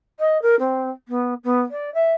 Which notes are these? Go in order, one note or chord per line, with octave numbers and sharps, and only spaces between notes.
D#5
A#4
C4
B3
B3
D5
E5